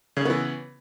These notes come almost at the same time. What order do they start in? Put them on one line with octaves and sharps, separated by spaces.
C#3 C#4 B3 E3